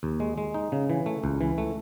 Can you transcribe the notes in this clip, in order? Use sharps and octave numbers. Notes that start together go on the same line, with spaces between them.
D#2
G#3
G#3
D#4
C#3
E3
A3
C#2
E3
A3